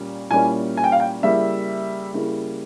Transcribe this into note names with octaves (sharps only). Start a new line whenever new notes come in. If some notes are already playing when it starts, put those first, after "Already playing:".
Already playing: A#2 G3 A#3 C#4
A#2 G3 A#3 C#4 E4 G#5
G#5
G5
F5
G5
C#3 G3 A#3 E4 E5
C#3 G3 A#3 E4